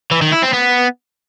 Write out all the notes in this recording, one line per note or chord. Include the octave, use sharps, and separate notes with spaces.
E3
D#3
E4
C4
B3